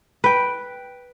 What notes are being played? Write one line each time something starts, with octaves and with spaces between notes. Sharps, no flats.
B4 G5